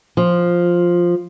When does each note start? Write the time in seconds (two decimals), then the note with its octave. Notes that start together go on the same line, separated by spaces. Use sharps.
0.17 F3